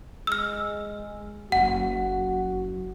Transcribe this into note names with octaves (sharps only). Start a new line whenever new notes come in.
G#3 E6 F6
F#1 F#2 F#4 F#5